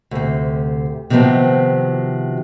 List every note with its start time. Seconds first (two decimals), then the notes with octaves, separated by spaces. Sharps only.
0.11 D2 C3
1.10 C3 D#3 F3 F#3 B3 C4